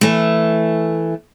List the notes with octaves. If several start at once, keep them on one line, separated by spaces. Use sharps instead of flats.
E3 A3